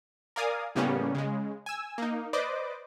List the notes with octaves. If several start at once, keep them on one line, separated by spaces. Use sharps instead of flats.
A#4 D5 F5 G#5 D#6
A2 C#3 G3 A#3 B3 C#4
C#3 G#3
G#5 E6
A#3 D#4
B4 C5 D5 D#5 D6